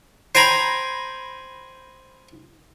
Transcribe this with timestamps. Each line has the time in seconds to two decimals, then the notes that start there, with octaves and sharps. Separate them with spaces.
0.35 C5 G5 G#5 A#5 B5